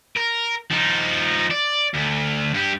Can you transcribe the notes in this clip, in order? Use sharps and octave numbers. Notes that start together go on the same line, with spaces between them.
A#4
F3 D#4
D5
D2
G2 G4